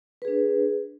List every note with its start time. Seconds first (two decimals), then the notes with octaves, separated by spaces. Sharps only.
0.22 B4
0.25 G#4
0.28 D4